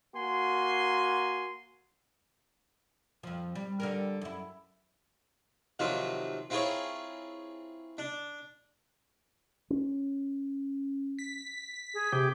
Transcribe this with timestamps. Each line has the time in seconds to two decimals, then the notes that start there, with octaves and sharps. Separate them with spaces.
0.15 A#3 F#4 G#5 C6
3.23 F2 F3
3.55 G3
3.80 D3 G3 A#4
4.21 F#2 E4
5.79 C3 D#3 F3 F#3 F4
6.50 C4 E4 F4 G#4 A#4 C#5
7.98 D4
9.70 C#4
11.19 B6
11.94 G#4
12.13 C3 G4